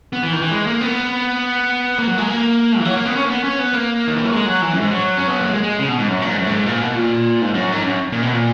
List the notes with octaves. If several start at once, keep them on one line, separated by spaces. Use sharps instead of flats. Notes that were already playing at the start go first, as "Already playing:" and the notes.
B3
E3
D#3
E3
G#3
A#3
B3
A#3
F#3
G#3
A#3
E3
F#3
A#3
B3
C#4
A#3
B3
C#4
B3
A#3
D#3
E3
F#3
G#3
F#3
E3
F#2
G#2
F#3
C#4
B3
A#3
G#3
G#3
C#3
B2
G#2
F#2
A#2
G#2
F#2
G#2
A#2
B2
A#2
G#2
F#2
G#2
F#2
A#2
B2
A#2